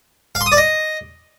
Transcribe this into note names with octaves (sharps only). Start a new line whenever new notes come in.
F5
C6
D#6
D5
D#5